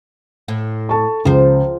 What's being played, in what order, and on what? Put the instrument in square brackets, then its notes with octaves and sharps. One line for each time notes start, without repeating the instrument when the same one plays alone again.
[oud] A2
[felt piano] A4 A5 C#6
[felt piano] C#2 [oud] F3 C5